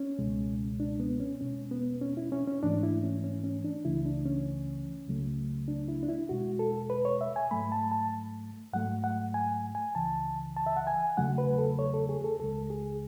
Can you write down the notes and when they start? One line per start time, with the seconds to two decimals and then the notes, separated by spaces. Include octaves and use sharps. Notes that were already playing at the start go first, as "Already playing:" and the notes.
Already playing: C#4
0.19 C#2 B2 G#3
0.80 D4
1.00 B3
1.20 C#4
1.40 E2 B2 G#3 C#4
1.71 B3
2.01 C#4
2.17 E4
2.32 C#4
2.47 C#4
2.63 G#2 E3 A3 D4
2.83 E4
3.03 C#4
3.24 C#4
3.44 C#4
3.64 D4
3.85 C#2 C#3 E3 A3 E4
4.06 D4
4.25 C#4
5.07 C#2 C#3 F#3 A3
5.68 D4
5.88 E4
6.03 D4
6.09 E4
6.29 E2 B2 G#3 F#4
6.59 A4
6.90 B4
7.05 C#5
7.21 E5
7.36 G#5
7.51 G#2 F#3 A3 B5
7.72 A5
7.91 A5
8.73 G#2 F#3 A3 F#5
9.04 F#5
9.34 G#5
9.75 G#5
9.95 C#2 C#3 E3 A5
10.56 A5
10.66 E5
10.77 F#5
10.87 G#5
11.17 E2 C#3 F#3 A3 F#5
11.38 B4
11.58 A4
11.79 C#5
11.94 A4
12.09 G#4
12.24 A4
12.40 C#2 C#3 G#3 A4
12.70 G#4